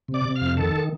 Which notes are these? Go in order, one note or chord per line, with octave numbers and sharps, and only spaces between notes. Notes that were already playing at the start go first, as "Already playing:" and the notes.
C3
D5 D6
C3
F5 F6
F2
D#3 A4 A5